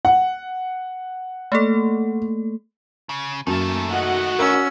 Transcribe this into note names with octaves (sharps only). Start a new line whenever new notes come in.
F#5
A3 A#3 A4
C#3
F#2 D#3 A3 A#3 A5
F#4 D#5 F#5
C#4 A#4 E6